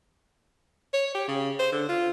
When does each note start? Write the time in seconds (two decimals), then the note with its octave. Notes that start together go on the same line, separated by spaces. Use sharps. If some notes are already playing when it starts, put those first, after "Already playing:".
0.93 C#5
1.14 G4
1.28 C#3
1.59 C5
1.72 D3
1.88 F4